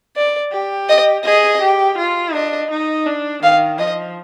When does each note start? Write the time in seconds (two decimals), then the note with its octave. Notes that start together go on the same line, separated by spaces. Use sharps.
0.17 D5
0.52 G4
0.89 D#5
1.25 G#4 D#5
1.61 G4
1.98 F4
2.34 D4 D#5
2.70 D#4
3.06 D4
3.43 D#3 F5
3.79 F3 D#5